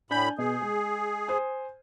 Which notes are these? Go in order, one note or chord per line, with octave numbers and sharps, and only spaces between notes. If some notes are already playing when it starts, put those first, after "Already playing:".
A2 D4 G#5 B5 G6
B2 G#4
G#3
C5 G#5 D#6